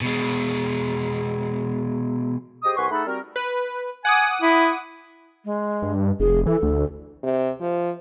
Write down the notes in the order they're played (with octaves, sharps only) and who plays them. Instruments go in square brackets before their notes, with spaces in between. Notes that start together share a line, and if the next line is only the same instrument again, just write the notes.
[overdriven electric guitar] B2 G#3
[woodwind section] G4 G#4 C5 D#5 D#6
C2 B4 F#5 G#5 C6 C#6
A3 D#4 G#4 A4 F#5 B5
G3 C4 F#4 A#4
[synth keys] B4
[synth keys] F#5 D6 D#6 [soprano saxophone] G#5
[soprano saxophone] E4
[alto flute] G#3
[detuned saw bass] G2
[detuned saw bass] F1 [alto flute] G#4
[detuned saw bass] E3 [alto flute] A4
[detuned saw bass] D2
[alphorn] C3
F3